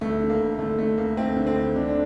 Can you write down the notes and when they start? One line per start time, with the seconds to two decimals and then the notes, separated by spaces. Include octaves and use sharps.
0.01 D2 A3
0.20 D3
0.30 A#3
0.40 D2
0.59 D3 A3
0.79 D3 A3
0.98 D2 A#3
1.17 D2 C4
1.37 D3
1.47 C4
1.56 D2
1.76 D3 D4
1.89 D4